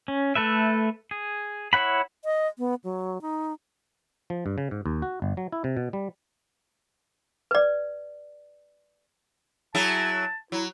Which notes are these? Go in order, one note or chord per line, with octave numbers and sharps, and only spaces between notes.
C#4
A3 A4 B4 E5
G#4
E4 C#5 F#5 B5
D#5
B3
F#3
D#4
F3
G2
C#3
G#2
D#2
F#4
G1
F#3
E4
C3
B2
G3
B4 D5
F#3 E4 G#4 A5
F#3 E4